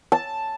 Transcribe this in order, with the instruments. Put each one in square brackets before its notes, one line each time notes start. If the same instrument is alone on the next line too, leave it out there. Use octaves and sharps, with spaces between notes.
[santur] A5